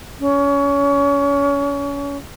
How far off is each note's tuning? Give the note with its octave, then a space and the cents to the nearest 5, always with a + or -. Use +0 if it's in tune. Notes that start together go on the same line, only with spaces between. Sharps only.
C#4 +30